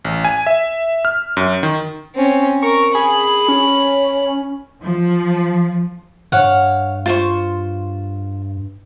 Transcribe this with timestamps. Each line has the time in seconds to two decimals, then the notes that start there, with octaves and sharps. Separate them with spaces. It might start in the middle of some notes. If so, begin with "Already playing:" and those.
0.05 A1
0.25 G#5
0.47 E5
1.05 F6
1.37 F#2
1.63 D#3
2.15 C4 C#4
2.62 A#4 C#6
2.95 G#4 B5
3.48 C#4
4.84 F3
6.32 G2 C#5 F5 F#5
7.06 F4 C5 C#6